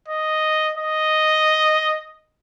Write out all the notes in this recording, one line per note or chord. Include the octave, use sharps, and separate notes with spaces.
D#5
D#5